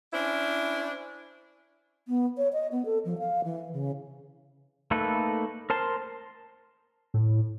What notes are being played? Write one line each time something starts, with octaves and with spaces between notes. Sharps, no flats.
C#4 D4 E4 C5
B3
C#5
D#5
B3
A4
F3
F5
E3
C#3
A3 A#3 D#4 A4 B4
A#4 C5 A5 C6
A2